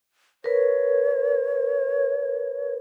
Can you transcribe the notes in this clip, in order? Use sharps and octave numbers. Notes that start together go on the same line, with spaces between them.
A#4 B4 C#5